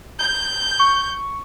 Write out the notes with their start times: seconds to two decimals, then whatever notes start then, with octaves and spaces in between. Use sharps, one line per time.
0.19 G6
0.80 C#6